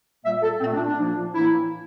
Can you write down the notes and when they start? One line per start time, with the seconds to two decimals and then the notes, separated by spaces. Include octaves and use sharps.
0.23 A#2 G3 A#3 E5
0.41 A4
0.60 A#2 A3 C4
0.73 D4
0.85 D4
0.98 A#2 F3 A#3
1.35 A2 E3 A#3 E4